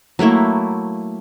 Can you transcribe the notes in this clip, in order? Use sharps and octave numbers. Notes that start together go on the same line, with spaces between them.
F#3 A3 A#3 E4